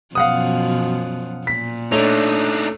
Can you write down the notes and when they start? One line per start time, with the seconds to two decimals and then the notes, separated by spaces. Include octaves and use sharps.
0.15 F#2 B2 F3 F5 F#5 D#6
1.47 A#2 B6
1.92 A3 D4 D#4 C#5